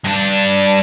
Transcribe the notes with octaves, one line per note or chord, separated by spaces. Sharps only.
G2 D4